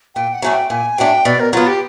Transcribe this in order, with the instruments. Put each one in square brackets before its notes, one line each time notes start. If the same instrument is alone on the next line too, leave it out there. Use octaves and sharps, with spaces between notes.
[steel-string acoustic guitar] A#2 [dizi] G5
[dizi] F#5
[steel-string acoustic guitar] F#3 A3 D4 [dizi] G#5
[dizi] G5
[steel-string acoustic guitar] A#2 [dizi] G#5
[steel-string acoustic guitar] F#3 A3 D4 [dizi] G5
[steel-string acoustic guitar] B2 [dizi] D5
[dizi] A#4
[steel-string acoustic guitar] F#3 B3 [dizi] F4
[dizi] G4